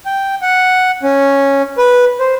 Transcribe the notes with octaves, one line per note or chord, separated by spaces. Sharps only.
G5
F#5
C#4
B4
C5